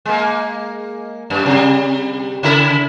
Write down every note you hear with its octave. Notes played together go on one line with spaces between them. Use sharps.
G#3 A#3
F#2
C3 G3
C#3 E4 A#4